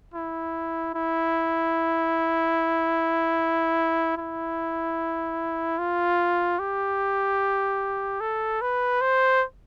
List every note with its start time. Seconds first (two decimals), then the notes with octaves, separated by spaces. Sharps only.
0.14 E4
0.94 E4
4.17 E4
5.78 F4
6.59 G4
8.21 A4
8.61 B4
9.01 C5